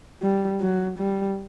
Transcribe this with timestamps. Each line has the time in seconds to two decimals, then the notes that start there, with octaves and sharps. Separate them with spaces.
0.22 G3
0.60 F#3
0.98 G3